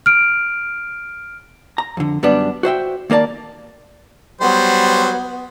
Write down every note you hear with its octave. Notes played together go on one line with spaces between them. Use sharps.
F6 D7
A#5
F2 D3
F#2 G3 B3 D4
F#4 C5 E5 G5
D#2 A#3 A#4 D5 A5
F#3 G3 B3 C5